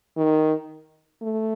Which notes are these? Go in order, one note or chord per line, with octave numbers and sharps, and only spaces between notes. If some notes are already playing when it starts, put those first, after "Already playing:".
D#3
A3